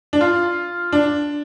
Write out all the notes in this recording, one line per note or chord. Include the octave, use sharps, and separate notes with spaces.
D4
F4
D4